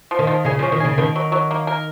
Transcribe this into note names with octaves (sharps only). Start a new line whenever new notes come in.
F3
D#3
F3
C#3 G#4
F3 C#4
D#3
C#3 G#4
B2 D#3
F#3
F#3
A#3
A#4